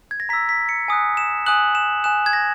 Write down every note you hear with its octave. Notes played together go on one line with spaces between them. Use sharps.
G#6
A#6
A#5 E6 B6
B6
C#7
G#5 D#6 F#6
E7
G#5 D#6 F#6 F#7
E7
G#5 D#6 F#6 E7
G#6
A#6